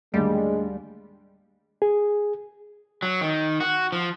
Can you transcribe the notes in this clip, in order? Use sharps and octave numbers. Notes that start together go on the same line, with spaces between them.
D#2 A2 D3 G3 G#3
G#4
F#3
D#3
F#4
F3